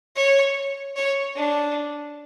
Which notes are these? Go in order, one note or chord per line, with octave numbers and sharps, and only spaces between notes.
C#5
C#5
D4